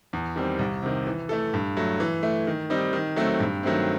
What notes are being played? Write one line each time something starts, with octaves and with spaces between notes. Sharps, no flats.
E2
D#3 G3 C4
C2
C3 D#3
E3
A3 E4 A4
G2
F#3 A3
E3
A3 E4
D#3
G3 C4 D#4
D#3
F#3 A3 C4
G2
D#3 F#3 A3 C4